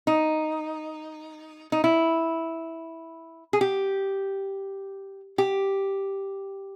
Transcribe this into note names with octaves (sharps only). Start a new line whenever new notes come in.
D#4
D#4
E4
G#4
G4
G4